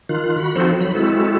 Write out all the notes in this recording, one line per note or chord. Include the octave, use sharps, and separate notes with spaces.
D#3 F4 F#6
F#4 B5
F3 C4 D#4 F#4 A4 C5
F#3 B5
G#3 C4 E4 F#4 A4